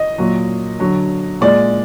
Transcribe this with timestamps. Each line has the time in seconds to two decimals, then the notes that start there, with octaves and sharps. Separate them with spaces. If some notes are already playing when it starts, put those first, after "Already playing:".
Already playing: D#5
0.18 A#2 F#3
0.79 D3 F#3
1.41 A#2 G#3 D5